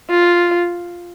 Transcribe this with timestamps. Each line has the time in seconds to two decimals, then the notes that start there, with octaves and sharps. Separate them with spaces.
0.10 F4